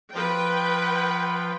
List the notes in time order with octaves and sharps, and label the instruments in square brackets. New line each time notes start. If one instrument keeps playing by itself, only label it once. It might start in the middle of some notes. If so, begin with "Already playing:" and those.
[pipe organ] F3 [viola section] B4 G5